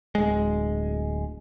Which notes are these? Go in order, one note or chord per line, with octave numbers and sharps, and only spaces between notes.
D1 G#3